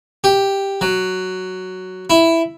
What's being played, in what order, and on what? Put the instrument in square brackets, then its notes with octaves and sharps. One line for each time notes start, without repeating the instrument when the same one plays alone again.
[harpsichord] G4
F#3
E4